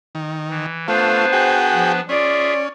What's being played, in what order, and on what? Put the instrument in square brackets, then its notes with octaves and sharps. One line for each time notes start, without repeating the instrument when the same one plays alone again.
[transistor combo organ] D#3
[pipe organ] E3
[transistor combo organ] A3 F4 [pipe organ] B3 D4 B4 [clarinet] C5
[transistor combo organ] F#4 G#4 G5
[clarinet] F3
[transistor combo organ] C#4 [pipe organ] F4 G#4 E5 [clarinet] D5